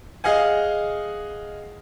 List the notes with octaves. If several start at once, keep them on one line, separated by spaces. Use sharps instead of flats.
G#4 D#5 F5 F#5 G#5